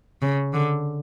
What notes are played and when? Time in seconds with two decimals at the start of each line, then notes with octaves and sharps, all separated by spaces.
0.22 C#3
0.53 D3